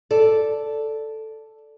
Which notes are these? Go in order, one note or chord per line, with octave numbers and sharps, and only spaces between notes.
A4 D5